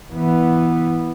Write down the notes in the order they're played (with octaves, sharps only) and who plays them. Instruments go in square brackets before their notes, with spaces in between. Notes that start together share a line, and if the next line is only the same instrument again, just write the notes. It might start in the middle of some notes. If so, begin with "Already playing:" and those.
[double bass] E3 B3